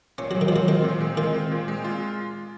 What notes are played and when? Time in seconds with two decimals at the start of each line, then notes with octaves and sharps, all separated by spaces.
0.18 A#2 C#4
0.31 F#3
0.35 G#3
0.41 D#3
0.48 F3
0.52 F#3 F4
0.68 D#3 C4
0.84 A#2
1.01 G#3
1.17 D#3 F4
1.34 C4
1.51 A#2
1.68 G#3
1.84 F4